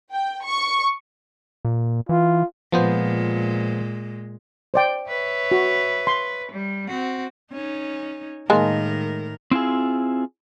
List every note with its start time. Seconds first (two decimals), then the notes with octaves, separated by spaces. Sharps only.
0.12 G5
0.45 C#6
1.65 A#2
2.09 E3 F4
2.72 A#2 F3 G#3 B3 C5
4.74 C5 D5 G5
5.07 B4 C#5 E5
5.52 F#4
6.07 C6
6.52 G3
6.89 C4 F#4
7.52 C#4 D#4
8.50 A2 D#3 G#3 A#3 A#4 A5
9.51 C4 E4 F4 G#4